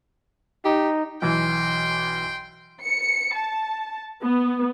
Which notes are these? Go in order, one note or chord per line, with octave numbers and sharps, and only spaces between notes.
D#4 G4
B1 E3 G5 C6
C#7
A5
B3